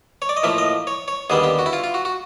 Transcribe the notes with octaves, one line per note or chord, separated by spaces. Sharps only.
C#5
D5
D#5
A2 F3 A#3 E5
D#5
C#5
C#5
D#2 D3 G3 B3 G#4
G4
F#4
E4
F4
F4
F#4
F#4